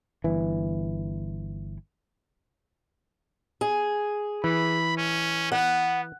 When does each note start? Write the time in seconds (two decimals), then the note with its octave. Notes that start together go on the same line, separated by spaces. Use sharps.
0.24 G1 E3
3.61 G#4
4.44 E3 B5
4.97 C#4
5.52 B3 F#5